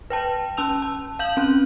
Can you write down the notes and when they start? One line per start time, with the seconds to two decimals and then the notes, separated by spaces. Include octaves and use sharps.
0.10 B4 G5 A5
0.57 C#4 A5 E6 F7
0.82 A5
1.19 F5 G6 F#7
1.37 C4 C#4